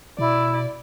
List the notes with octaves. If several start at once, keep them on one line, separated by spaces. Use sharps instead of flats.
B2 E4 D5